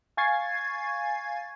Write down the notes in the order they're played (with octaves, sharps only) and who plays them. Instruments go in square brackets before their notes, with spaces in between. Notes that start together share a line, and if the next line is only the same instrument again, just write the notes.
[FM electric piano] F5 G#5 C#6 G#6 A6 C7